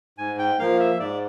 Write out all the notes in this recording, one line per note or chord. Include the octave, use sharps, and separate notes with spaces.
G#2 G#5
G5
F3 A#3 F5
E5
G#2 D5